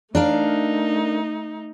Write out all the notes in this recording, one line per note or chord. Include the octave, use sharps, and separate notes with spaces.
A3 D4 D#4 A#4 F5